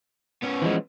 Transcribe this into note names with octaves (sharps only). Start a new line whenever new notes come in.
B3 C#4
E3 F3 G#3